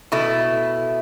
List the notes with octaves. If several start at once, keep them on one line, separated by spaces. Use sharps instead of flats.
B2 A3 E4